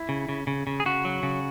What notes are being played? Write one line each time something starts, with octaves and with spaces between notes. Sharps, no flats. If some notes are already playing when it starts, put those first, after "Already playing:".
Already playing: E4
C#3
C#3
C#3
C#3
G#4
C#3 F#4
F#3
C#3